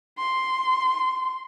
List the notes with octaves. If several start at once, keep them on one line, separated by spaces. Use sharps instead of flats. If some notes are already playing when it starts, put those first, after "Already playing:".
C6